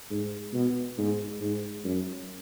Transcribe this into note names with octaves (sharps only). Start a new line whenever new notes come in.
G#2
B2
G#2
G#2
F#2